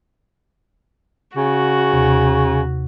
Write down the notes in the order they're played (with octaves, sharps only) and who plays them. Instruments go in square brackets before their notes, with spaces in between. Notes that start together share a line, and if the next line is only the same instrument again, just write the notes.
[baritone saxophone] C#3 [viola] F#4
[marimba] D#2 C3